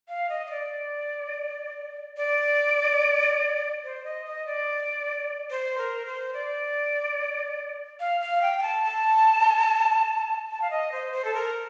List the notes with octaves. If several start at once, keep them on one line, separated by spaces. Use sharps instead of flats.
F5
D#5
D#5
D5
D5
C5
D#5
D#5
D5
C5
A#4
C5
D5
F5
F5
G5
G5
A5
A5
A5
F5
D#5
C5
C5
A4
A#4